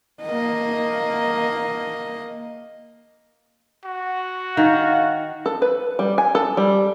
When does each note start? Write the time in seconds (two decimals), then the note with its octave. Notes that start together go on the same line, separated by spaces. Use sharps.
0.24 A#3 D#5
3.85 F#4
4.57 D#3 F5
5.46 A4
5.62 B4
5.99 G3
6.18 G#5
6.35 A4
6.57 G3